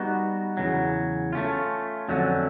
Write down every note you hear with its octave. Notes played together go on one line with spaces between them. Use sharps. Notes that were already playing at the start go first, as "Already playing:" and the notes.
Already playing: G3 B3 D#4 F#4
E2 C#3 F#3
A3 C#4 F4
F2 D3 F#3 A3 C#4